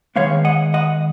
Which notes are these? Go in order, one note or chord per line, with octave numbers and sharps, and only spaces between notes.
D#3 G#3 B3 C#5 F5
D#5 F#5
D#5 F#5